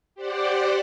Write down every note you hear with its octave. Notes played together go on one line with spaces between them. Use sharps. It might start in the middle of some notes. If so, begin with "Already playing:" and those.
G4 C5 D5 F#5 D6